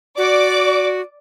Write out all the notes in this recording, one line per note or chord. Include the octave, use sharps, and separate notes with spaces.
F#4 D5 D6